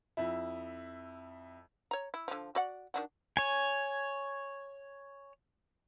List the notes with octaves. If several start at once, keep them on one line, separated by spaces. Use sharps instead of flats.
F2 E4
C#5 A#5
E4
D3 F3
F#4 D5 F#5
D#3 D4 F#4
C#5 G#5